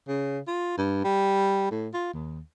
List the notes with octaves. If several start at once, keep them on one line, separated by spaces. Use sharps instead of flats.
C#3
F4
G2
G3
A2
F4
D#2